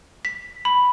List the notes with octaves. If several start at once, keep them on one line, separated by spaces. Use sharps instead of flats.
B6
B5